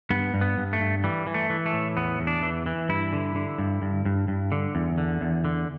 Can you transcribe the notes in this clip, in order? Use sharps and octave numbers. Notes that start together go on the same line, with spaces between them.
G2 B3
G2
B3
G2
A3
G2
E3 G3
E3
A3
E3
A3
A2
E2 B3
E2
D4
E3
E3
G2 E4
D3
D3
G2
G2
G2
G2
D3
E2
D3
E2
D3